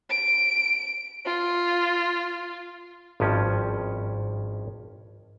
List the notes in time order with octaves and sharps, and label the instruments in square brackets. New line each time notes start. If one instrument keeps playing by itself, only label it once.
[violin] D7
F4
[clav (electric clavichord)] G#1 G2 F3 C#4